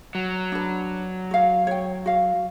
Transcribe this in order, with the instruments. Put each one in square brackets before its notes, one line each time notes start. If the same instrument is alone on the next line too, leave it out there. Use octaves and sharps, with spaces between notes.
[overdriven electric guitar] F#3
[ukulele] D4 B4
F#4 F5
C#5 G5
F#4 F5